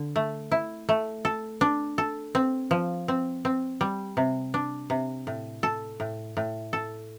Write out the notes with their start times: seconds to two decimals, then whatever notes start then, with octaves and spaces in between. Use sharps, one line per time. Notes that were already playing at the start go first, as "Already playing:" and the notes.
Already playing: D3
0.16 A3
0.52 E4
0.89 A3
1.25 A4
1.61 D4
1.98 A4
2.35 C4
2.71 F3
3.08 C4
3.45 C4
3.81 G3
4.17 C3
4.54 D4
4.90 C3
5.27 A2
5.63 A4
6.00 A2
6.37 A2
6.73 A4